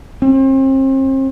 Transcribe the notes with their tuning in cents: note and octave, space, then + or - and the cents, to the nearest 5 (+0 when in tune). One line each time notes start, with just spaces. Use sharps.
C4 +40